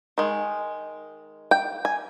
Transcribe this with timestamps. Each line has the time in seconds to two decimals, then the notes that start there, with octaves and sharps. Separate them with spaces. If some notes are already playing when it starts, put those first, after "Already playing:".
0.18 D#3 G#3
1.51 G5
1.85 G#5